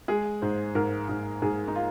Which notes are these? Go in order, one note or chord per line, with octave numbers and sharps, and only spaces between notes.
G#3 G#4
G#2 C5
G#2 A#4
G#2
G#2 G#4
D#4
F4